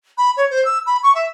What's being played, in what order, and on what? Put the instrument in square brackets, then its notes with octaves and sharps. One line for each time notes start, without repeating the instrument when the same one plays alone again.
[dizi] B5
C#5
C5
E6
B5
C#6
E5